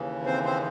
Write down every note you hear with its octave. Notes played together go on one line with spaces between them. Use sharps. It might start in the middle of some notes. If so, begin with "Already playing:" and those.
Already playing: D#2 C#3 E3
C4 C5
C4 C5